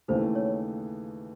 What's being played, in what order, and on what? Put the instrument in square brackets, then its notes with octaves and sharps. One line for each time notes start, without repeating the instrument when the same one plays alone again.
[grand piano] D#2 C#3 E3 A3 [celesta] C5
[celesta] C#5